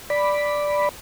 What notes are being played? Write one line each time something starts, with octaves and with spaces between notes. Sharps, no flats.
D5 B5